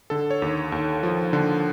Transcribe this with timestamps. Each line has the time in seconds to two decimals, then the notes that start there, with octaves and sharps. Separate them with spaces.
0.10 D3 A4
0.31 C#5
0.42 D#2
0.72 D#2
1.03 F3
1.33 D3